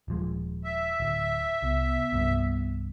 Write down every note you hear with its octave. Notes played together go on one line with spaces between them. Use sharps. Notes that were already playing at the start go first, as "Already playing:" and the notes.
D#1 F3 G#3
E5
D1
C2 B3
C2 G2